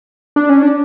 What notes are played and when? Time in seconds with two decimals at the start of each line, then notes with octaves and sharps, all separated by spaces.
0.36 D4
0.49 C#4
0.63 D4